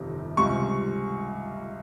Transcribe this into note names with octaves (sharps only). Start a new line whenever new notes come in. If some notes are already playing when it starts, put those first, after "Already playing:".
Already playing: G1 F2 C3 D#3 G3
C#2 C3 G3 C#6